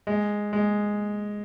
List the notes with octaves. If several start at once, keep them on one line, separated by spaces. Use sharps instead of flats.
G#3
G#3